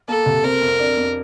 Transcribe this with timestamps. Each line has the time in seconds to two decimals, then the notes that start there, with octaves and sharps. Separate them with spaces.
0.08 A#3 A4
0.26 C2
0.44 C4 A#4
0.62 F2
0.79 D4
0.97 F2